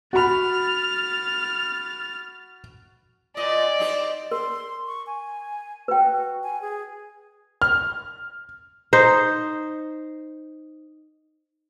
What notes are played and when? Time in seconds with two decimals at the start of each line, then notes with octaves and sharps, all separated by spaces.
0.13 F#4 B5 F6 A6
3.37 A#2 D5 D#5
3.79 C4 D#4 G4
4.31 A#4 C6
4.87 C#6
5.07 G#5
5.88 F#4 B4 G5
6.43 G#5
6.62 G#4
7.62 F6
8.93 D#4 C5